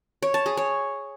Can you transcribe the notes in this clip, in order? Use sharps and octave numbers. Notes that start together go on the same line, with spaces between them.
C#5
A5
G#4
C#5